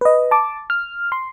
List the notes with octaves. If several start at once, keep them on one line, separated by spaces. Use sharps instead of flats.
B4 D#5
A5 D6
F6
C6